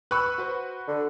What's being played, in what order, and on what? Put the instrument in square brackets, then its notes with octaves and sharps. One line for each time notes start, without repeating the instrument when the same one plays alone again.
[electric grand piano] B4 B5 E6 [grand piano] C#6 F#6
[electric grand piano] F#4 B4 C5
[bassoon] D3